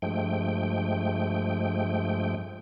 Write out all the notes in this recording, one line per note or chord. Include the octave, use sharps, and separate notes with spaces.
G2 F3 G#3 A3 G5